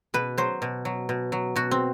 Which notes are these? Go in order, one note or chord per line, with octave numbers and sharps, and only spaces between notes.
B2 B4
F#3 C5
B2
F#3
B2
F#3
B2 F#4
C4